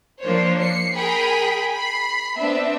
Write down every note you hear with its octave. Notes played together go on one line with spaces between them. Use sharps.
F3 A#3 D4 C5 C#5
C7 C#7
G#4 A#4 G5 B5
B5 C7
B3 C4 D4 E5